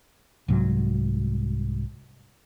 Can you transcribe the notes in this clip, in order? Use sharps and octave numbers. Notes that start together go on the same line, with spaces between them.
C2 G#2 F#3